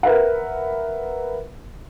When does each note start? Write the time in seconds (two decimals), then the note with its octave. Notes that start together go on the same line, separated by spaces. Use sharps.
0.03 A#4 B4 E5 F#5